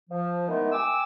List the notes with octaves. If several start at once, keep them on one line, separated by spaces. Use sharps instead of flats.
F3
D#3 E3 G#3 A3 B3 D#4
G5 G#5 D6 E6